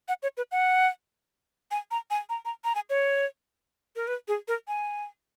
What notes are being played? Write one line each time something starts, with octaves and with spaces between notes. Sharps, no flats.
F#5
C#5
B4
F#5
G#5
A#5
G#5
A#5
A#5
A#5
G#5
C#5
A#4
B4
G#4
A#4
G#5